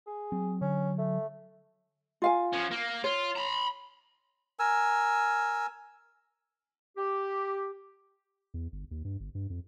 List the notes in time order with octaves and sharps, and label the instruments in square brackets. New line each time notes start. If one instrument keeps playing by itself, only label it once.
[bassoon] G#4
[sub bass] F#3 [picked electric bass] C4
[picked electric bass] D3 [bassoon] C#4
[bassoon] A3
[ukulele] F4 F5 G#5
[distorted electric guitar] F3 C#4
A#3
[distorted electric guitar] F4 [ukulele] C#5
[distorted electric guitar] A#5 B5
[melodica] A#4 G#5 E6
[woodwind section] G4
[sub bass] E2
G1
D#2
G2
G1
G2
F2